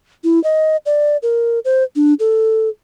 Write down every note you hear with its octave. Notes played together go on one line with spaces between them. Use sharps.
E4
D#5
D5
A#4
C5
D4
A4